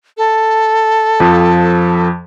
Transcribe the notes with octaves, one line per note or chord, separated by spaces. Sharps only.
A4
F2 F3